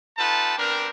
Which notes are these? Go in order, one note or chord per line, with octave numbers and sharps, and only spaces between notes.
D#4 F4 A4 B4 G5 A5
G3 B3 C4 D4 A#4